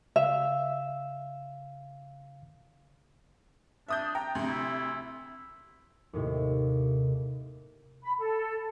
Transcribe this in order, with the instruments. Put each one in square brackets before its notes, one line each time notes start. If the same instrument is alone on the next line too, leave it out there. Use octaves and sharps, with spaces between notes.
[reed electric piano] C#3 F5 [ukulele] E5
[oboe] D4 [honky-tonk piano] E5 D#6 G6
[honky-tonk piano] G5 [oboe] A#5
[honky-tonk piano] D2 C3
[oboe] E4
[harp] D#2 A2 C3
[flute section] B5
A4